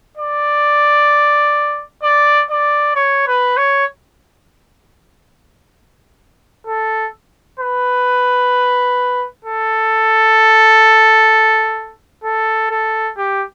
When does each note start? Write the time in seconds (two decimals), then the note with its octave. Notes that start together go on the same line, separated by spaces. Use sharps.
0.18 D5
2.03 D5
2.50 D5
2.96 C#5
3.27 B4
3.57 C#5
6.67 A4
7.60 B4
9.45 A4
12.24 A4
12.70 A4
13.17 G4